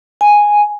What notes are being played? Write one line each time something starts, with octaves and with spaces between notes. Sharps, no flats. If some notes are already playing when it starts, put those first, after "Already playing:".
G#5